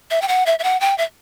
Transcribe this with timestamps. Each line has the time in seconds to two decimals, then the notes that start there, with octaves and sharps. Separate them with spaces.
0.11 E5
0.22 G5
0.28 F#5
0.46 E5
0.59 E5
0.64 F#5
0.81 G5
0.98 E5